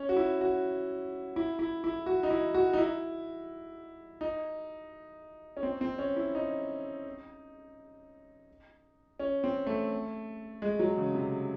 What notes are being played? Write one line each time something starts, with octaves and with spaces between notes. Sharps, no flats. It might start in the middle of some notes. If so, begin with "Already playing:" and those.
Already playing: C#4
F#4
E4
F#4
E4
E4
E4
F#4
D#4
E4
F#4
D#4
E4
D#4
C#4
C4
C4
C#4
E4
D#4
C#4
C4
A3
G#3
F#3
C#3
C3